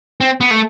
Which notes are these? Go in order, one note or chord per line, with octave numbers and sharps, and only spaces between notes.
C4
B3
A3